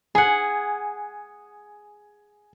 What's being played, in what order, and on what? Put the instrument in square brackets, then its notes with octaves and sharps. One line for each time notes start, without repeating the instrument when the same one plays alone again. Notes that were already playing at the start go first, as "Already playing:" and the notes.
[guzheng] G#4 F#5 [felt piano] G#5